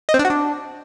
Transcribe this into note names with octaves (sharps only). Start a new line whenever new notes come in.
D#5
C4
D4
F#4
D4